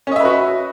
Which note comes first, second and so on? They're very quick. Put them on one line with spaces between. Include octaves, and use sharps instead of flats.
C#4 D#5 E5 B4 F#4